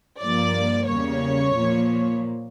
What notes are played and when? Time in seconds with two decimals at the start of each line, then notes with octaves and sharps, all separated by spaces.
0.19 G2 F3 A#3 D5
0.87 E2 C#3 G3 A#3 C#5
1.56 A#2 F3 A#3